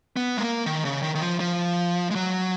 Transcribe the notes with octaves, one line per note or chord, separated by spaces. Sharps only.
B3
G#3
A#3
D#3
C#3
D#3
D#3
F3
F3
G#3
F#3